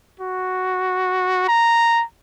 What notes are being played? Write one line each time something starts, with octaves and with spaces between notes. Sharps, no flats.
F#4
A#5